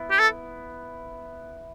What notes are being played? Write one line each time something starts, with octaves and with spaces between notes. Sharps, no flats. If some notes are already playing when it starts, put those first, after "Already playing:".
Already playing: B3 E4
G4
A4